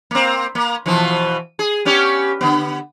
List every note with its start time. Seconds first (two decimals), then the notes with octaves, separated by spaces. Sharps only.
0.11 A#3 C4
0.55 A#3
0.86 B2 E3 F3
1.59 G#4
1.85 B3 C#4 G4
2.41 D3 B3